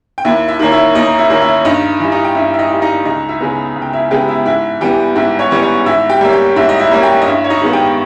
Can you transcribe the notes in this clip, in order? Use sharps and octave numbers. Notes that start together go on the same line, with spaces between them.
G5
D#2 E4 E5
E4 E5
D#3 A#3 C#4
E4 E5
D#2 D#4 D#5
E4 E5
D#3 A#3 C#4
E4 E5
G2 D#4 D#5
E3 G3
D#4 D#5
G5
G2 E4 E5
E5
D#4 D#5
E3 G3
D#4 D#5
C#2 D#4 D#5
E4 E5
C#3 G#3 B3
C#2
G5
E4 E5
C#3 G#3 B3 G4 G5
E4 E5
G#2 E4 E5
E3 G3 B3 G4 G5
G#2 E4 E5
C#4 C#5
E3 G3 B3
C#4 C#5
G#2 E4 E5
G4 G5
G3 A#3 C#4 E5
G4 G5
G#2 E4 E5
D#5
E4 E5
G3 A#3 C#4
G4 G5
D#5
G2 E4 E5
C#5
D#4 D#5
D#3 G#3 B3
G4 G5